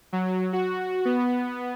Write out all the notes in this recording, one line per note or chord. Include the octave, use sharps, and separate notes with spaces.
F#3
F#4
B3